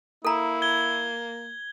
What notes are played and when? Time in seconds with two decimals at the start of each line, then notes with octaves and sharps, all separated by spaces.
0.25 A#3 E4 A4 A#5
0.62 G#6 G7